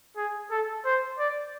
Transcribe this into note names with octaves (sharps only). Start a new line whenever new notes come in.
G#4
A4
C5
D5